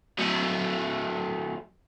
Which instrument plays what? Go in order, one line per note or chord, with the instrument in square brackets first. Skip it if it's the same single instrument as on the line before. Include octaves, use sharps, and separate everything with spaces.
[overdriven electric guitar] F#3 A3